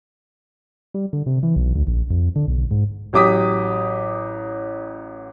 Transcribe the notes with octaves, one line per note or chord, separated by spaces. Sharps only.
G3
D3
C3
E3
B1
D2
A#1
F2
D3
B1
G#2
A1 F#3 G4 D6 D#6 B6